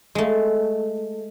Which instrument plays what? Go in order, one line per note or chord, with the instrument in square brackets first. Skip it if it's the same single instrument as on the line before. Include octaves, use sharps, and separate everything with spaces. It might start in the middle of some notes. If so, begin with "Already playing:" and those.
[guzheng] G#3 A3